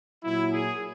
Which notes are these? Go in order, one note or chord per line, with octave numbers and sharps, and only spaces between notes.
A#2 F#3 E4
G#4